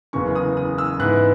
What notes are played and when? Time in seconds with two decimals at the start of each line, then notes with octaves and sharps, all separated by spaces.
0.13 F#1 E2 C#3 E3 C#6
0.36 D#6
0.57 D#6
0.78 E6
0.99 G#2 E3 B3 E4 F#6